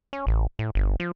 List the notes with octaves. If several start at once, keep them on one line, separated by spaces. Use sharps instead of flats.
C#4
A1
A2
G1
F3